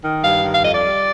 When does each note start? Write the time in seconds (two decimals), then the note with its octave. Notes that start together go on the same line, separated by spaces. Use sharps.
0.02 D#3
0.22 G2 F5
0.42 D#3
0.53 F5
0.63 F2 D#5
0.72 D5
0.83 G3